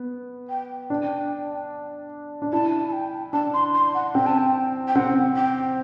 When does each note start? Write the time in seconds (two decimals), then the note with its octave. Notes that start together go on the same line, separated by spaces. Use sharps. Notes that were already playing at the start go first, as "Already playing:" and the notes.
Already playing: B3
0.49 G5
0.90 D4 G5
2.42 D4
2.53 E4 A5
2.88 A5
2.93 G5
3.33 D4 A5
3.54 C6
3.74 C6
3.95 F#5
4.15 C4 G5
4.26 A5
4.38 G5
4.88 G5
4.96 C4 F#5
5.36 G5